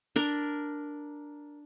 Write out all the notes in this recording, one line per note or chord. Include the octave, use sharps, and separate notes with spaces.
D4 A#4